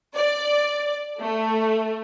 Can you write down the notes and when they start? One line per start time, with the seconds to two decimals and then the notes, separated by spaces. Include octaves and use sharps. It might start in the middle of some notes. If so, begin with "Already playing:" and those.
0.16 D5
1.21 A3